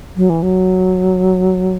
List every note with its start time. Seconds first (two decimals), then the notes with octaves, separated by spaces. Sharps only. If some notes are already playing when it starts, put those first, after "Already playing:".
0.16 F#3
0.30 E3
0.43 F#3